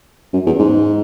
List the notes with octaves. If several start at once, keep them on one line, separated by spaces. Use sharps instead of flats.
F#2
E2
G#2